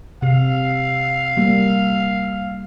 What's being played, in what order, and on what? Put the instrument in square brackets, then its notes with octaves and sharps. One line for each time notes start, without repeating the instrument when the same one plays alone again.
[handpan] C3 [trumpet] F5
[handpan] G3 A#3